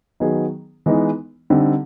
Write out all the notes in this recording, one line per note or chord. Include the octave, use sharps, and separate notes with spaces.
D#3 F#3 B3 D#4 G#4
E3 G#3 B3 D#4
D3 G3 C4 D#4